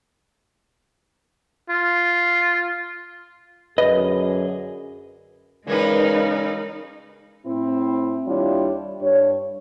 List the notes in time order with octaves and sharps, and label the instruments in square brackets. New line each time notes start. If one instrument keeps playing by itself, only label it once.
[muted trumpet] F4
[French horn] F#2 [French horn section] D3 G#4 [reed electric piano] B4 [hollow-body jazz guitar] D#5
[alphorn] C#3 [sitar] E3 G3 B4 [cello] G#3 D#4 [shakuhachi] A#4
[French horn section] A2 C4 E4
D#2 G3 D4 E4 F4 C#5
G2 D4 G4 C#5